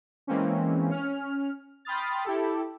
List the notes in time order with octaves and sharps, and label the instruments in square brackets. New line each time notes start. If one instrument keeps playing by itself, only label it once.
[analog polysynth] E3 G#3 A#3 C4 C#4
C#4 F6
G5 B5 C6 D#6 F6 A6
E4 G4 A4